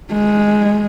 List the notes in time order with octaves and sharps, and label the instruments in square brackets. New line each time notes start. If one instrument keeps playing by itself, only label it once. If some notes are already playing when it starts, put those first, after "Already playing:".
[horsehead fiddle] G#3